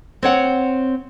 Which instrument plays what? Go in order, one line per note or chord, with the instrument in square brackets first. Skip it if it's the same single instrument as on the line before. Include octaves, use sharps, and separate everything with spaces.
[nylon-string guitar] C4 C#5 F#5